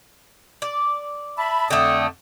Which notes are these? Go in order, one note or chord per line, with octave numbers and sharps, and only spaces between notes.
D5
E5 A5 B5
F2 D3 A3 G5 D#6